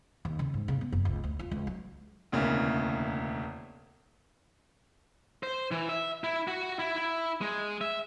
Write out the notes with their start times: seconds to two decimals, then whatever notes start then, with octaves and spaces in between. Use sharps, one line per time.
0.25 D#2
0.39 C#3
0.54 G#2
0.68 C#3
0.81 B3
0.92 F#1
1.05 C#2
1.24 D2
1.39 F4
1.51 C#2
1.67 F#3
2.32 E1 D2 C#3 A#3 B3 E4
5.43 C5
5.71 E3
5.89 E5
6.24 E4
6.48 F#4
6.79 E4
6.97 E4
7.41 G#3
7.81 E5